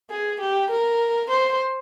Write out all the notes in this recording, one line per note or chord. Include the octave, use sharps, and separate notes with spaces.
G#4
G4
A#4
C5